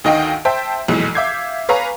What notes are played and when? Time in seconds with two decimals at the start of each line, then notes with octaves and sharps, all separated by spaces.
0.04 D2 D#3 D#4 D#5 F5 G5
0.45 C5 E5 G5 A5
0.88 B1 F2 A#2 E3 G#3
1.15 E5 F5 D6 G6 G#6 C7
1.69 B4 C#5 F5 G#5 A#5